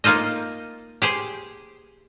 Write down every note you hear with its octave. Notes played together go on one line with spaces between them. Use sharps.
A#3 D#4 F4 C5 D#5
G4 G#4 C5